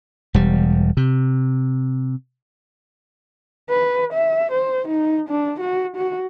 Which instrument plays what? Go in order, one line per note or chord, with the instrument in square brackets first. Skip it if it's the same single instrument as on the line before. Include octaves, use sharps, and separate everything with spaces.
[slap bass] E1 G3
C3
[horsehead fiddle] B4
E5
C5
D#4
D4
F#4
F#4